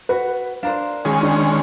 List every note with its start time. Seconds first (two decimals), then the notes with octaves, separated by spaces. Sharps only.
0.09 F#4 B4
0.63 D4 A#4 C5 F5
1.05 D#3 G#3 C#4 G#4
1.22 D4